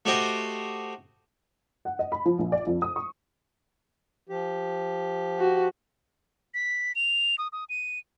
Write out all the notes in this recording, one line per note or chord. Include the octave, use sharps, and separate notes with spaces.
A3 F#4 G4 C5 D#5
F#5
D#5
B5
F3
A#1
D5
F2
D#6
C#6
F3 G4
F#4
B6
F7
D#6
D#6
D#7